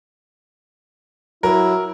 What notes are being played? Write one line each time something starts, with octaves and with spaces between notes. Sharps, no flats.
F#3 E4 A#4